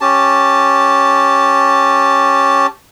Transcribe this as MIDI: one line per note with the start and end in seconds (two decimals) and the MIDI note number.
0.01 2.67 61
0.01 2.67 67
0.01 2.67 81